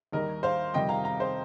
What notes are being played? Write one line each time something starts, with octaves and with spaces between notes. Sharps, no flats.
D#2 D#3 G3 A#4 D#5
C5 F5
F2 C3 D#3 G3 D#5 G5
F5 A#5
F5 A#5
C5